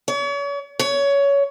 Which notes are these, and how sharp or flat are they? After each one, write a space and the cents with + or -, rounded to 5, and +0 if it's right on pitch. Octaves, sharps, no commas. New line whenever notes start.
C#5 +40
C#5 +20